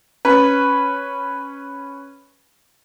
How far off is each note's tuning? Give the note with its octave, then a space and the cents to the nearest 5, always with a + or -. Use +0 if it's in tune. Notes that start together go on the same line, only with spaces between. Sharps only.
C#4 +0 B4 +0